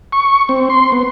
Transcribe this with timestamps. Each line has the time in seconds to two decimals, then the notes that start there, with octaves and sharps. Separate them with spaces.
0.12 C#6
0.49 C4
0.70 C6
0.92 B3